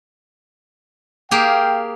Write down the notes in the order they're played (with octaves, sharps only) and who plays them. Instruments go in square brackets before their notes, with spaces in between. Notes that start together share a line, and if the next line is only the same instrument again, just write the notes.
[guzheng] A#3 G4 G#4 [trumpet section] F5 G5